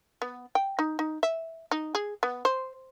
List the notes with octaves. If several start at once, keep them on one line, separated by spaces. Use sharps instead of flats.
B3
G5
D#4
D#4
E5
D#4
G#4
B3
C5